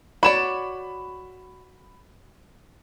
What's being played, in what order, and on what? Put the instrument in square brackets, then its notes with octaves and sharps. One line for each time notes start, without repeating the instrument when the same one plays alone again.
[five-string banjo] F#4 C#5 D5 [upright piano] B5 E7